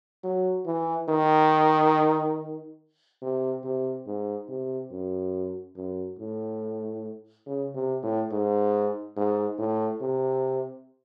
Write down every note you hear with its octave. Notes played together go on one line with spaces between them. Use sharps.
F#3
E3
D#3
C3
C3
G#2
C3
F#2
F#2
A2
C#3
C3
A2
G#2
G#2
A2
C3